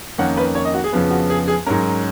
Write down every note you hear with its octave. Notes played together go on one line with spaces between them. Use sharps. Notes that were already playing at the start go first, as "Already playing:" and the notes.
F2 D#3 A#3 C#4 F#5
B4
C#5
D#5
F#4
G#4
F2 C#3 F3 B3
F#4
G#4
G#4
G#2 F#3 C#4 A#4